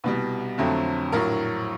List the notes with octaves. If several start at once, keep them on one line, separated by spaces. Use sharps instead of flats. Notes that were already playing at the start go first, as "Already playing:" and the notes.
C2 B2 G3 B4
F2 D3 F#3 A3 C4
A#1 A2 F#3 A#4